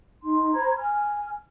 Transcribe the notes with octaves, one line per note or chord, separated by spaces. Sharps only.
D#4 C6
C5 A#5 B5 G#6
G#5 F6